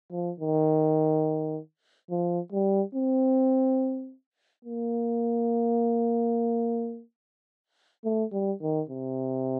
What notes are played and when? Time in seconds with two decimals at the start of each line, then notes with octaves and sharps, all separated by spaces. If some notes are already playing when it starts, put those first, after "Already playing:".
0.11 F3
0.40 D#3
2.10 F3
2.52 G3
2.95 C4
4.64 A#3
8.04 A3
8.32 G3
8.61 D#3
8.89 C3